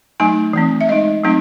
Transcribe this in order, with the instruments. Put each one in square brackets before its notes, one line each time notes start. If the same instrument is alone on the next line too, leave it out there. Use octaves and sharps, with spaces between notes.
[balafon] F#3 A3 D#4 G#5
E3 A3 C4
E5
G#3 D#4 D#5
F#3 A3 C4 D#4